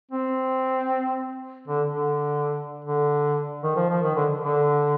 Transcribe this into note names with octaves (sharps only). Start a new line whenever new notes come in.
C4
D3
D3
D3
D#3
F3
F3
D#3
D3
D3